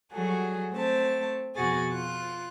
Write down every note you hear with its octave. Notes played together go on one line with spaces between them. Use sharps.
F#3 G3 F#4 G#4 A4
A3 C4 A5
F2 B2 F#4 G#4 G#5 A6
F4 F#6